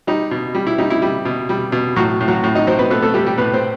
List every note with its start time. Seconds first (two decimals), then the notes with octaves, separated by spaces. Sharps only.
0.07 G3 D#4
0.31 B2
0.55 G3
0.67 E4
0.78 G3 D#4
0.90 E4
1.02 G3
1.25 B2
1.49 G3
1.72 B2
1.96 A2 F#3 F#4
2.20 A2
2.28 F#3 F#4
2.44 A2
2.55 D#4 D#5
2.67 F#3 C4 C5
2.79 B3 B4
2.90 A3 B3 B4
3.02 A3 A4
3.14 G3 A3 G4
3.26 G3 G4
3.38 A2 B3 B4
3.54 C4 C5